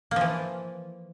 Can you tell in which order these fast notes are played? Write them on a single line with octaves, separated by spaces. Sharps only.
A#3 F3 E3